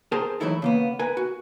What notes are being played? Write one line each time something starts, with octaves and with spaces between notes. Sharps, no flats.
G#4 A#4 C5 G5 A5
E3 F#3 A3 D#4 E4 A4
C#3 A#3 B3
A#4 B4 G#5
F#4